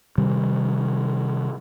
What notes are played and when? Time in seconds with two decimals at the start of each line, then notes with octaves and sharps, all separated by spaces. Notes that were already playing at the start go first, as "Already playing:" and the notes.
0.18 C3 D#3 G3